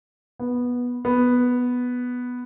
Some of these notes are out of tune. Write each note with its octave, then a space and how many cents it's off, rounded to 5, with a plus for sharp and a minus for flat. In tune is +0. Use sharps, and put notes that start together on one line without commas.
B3 -10
B3 +0